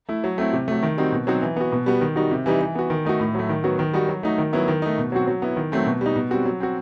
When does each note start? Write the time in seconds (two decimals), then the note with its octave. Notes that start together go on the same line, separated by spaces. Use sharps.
0.09 A3 E4
0.24 F#3
0.38 A3 C4 E4
0.53 C3
0.68 F#3 A3
0.83 D#3
0.97 G3 C4 D#4 F#4
1.12 B2
1.27 F#3 C4 D#4 F#4
1.42 E3
1.56 B3 F#4
1.72 B2
1.86 G3 B3 F#4
2.01 D#3
2.16 G3 D#4 F#4
2.31 C3
2.46 E3 G3 D#4
2.61 E3
2.75 B3 F#4
2.90 D#3
3.05 A3 D#4 F#4
3.20 A2
3.35 F#3 A3
3.49 D#3
3.64 F#3 B3 F#4
3.79 D#3
3.93 G3 D#4 F#4
4.09 F#3
4.23 A3 D#4 F#4
4.38 D#3
4.53 F#3 B3 E4
4.68 D#3
4.82 A3 D#4
4.98 B2
5.12 F#3 C4 F#4
5.27 F#3
5.42 B3 E4
5.56 D#3
5.72 F#3 A3 C4
5.86 B2
6.01 G3 D#4
6.16 B2
6.31 G3 C4 F#4
6.45 F#3
6.60 C4 F#4